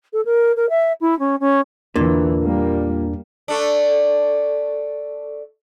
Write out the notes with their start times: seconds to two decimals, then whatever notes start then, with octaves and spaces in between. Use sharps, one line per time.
0.13 A4
0.25 A#4
0.56 A#4
0.69 E5
1.01 E4
1.19 C#4
1.40 C#4
1.96 E2 A#2 D3 E3 D4 A#4
2.43 G3 A#3
3.48 A3 D4